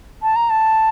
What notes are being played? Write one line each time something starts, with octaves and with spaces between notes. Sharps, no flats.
A5
A#5
A5